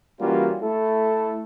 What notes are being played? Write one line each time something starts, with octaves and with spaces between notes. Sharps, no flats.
E3 G3 A#3 C#4 F4 F#4
A3 E4 A4